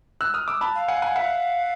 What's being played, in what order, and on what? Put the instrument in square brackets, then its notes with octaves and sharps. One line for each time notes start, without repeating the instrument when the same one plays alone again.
[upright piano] E6 F#6
D#6 F6
D6 E6
A5 B5
[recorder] F5
[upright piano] F#5 G#5
F#5 G#5
E5 F#5